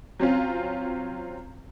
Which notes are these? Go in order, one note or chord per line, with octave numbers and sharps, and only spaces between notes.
F#3 C4 C#4 F4